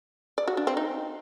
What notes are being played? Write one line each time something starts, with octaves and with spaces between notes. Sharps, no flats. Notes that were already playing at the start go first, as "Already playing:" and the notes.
D5
F#4
D4
C4
D#4